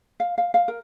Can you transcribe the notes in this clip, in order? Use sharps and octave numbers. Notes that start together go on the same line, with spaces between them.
F5
F5
F5
A#4